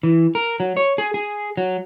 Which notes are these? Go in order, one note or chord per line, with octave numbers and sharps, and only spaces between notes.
E3
A#4
F#3
C#5
G#4
G#4
F#3